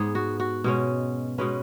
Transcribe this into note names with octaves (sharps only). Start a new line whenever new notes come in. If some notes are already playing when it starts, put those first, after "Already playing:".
Already playing: G#2 B3 G#4
F#4
F#4
B2 G#3 C#4
B2 G#3 C#4 B4